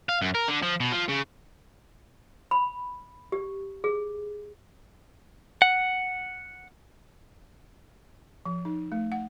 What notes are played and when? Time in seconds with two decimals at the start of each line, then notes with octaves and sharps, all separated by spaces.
0.09 F5
0.22 F#2
0.35 A#4
0.48 D3
0.63 F3
0.80 B2
0.92 F3
1.09 C#3
2.51 B5
3.32 G4
3.84 G#4
5.62 F#5
8.46 F3
8.65 D#4
8.92 A3
9.12 F#5